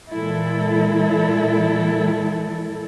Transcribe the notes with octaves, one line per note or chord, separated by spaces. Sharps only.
A#2 E3 G#3 E4 A4